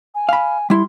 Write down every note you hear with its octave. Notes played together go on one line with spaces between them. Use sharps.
G#5
F5 B5
G3 E4 C6